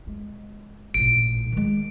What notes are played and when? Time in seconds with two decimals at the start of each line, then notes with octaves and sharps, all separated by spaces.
0.07 G#3
0.94 A1 A#2 D7
1.52 D#3 G#3